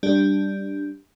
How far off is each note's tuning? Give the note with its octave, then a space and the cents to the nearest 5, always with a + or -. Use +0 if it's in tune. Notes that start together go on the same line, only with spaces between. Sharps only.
G3 +0 D4 +0